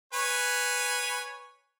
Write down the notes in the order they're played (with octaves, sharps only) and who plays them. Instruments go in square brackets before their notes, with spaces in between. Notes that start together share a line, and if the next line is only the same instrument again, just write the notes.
[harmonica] B4 C#5 G#5